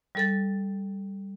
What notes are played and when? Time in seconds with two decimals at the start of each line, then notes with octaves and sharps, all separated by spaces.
0.15 G3 A4 A6